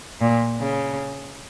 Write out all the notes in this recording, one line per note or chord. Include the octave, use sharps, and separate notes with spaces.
A#2
C#3